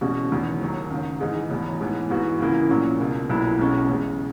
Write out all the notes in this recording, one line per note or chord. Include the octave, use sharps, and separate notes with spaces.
E2 B2 G#3 C#4 F#4
E1 E2 D#3
D#2 D#3 F#3
F#1 F#2 D#3
G#2 E3 G#3 D#4 G#4
E1 E2 B2
G#2 E3 B3
G#2 E3 B3 F#4
C#2 C#3 E3 A#3 E4
A#1 A#2 F#3 C#4
C#2 B2 A#3
B1 A#2 F#3 B3 E4
B1 B2 G#3 C#4
E2 C#3 G#3